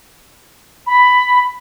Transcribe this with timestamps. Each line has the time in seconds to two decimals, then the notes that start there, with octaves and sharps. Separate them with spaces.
0.87 B5